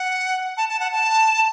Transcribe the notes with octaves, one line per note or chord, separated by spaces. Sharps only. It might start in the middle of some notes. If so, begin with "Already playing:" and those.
Already playing: F#5
A5
A5
F#5
A5